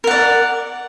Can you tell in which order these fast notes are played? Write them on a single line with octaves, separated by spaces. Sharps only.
A#4 F#5 D5